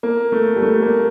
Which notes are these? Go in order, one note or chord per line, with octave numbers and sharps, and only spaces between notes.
A#3
A3
G3
A3
A#3